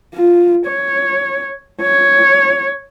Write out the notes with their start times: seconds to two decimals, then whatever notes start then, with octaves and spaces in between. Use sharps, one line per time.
0.15 F4
0.67 C#5
1.82 C#5